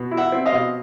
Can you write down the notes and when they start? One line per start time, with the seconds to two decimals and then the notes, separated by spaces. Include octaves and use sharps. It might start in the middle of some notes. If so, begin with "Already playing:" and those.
Already playing: B2
0.11 E4
0.17 E5 F#5
0.32 C4
0.46 D#5 F5
0.52 B2